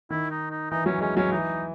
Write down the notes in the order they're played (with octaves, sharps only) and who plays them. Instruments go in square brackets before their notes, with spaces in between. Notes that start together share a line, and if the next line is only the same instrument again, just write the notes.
[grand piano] D#3 [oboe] E4
[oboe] D#4
D#4
[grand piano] E3 [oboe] D#4
[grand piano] F#3 [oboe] C#4
[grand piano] G#3 [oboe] C#4
[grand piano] F#3 [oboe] C#4
[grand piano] E3 [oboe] D#4